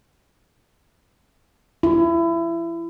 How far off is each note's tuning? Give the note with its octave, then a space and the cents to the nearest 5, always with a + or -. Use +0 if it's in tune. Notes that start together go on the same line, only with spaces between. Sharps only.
E4 +25